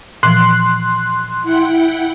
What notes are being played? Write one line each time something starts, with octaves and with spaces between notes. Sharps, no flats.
A#2 E3 F3 C6 F#6
E4 F#5 G5